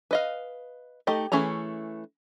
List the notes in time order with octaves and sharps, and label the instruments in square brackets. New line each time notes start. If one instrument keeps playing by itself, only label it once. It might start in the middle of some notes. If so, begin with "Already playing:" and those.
[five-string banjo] B4 D#5 F5
A3 D#4 G4 D#5
E3 A3 C#4 G#4 A#5